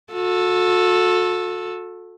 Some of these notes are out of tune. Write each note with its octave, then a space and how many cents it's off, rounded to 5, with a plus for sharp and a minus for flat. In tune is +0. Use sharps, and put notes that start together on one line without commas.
F#4 -40 A4 +0